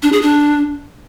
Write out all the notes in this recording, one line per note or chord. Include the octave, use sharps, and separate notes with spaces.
D4
G#4
D4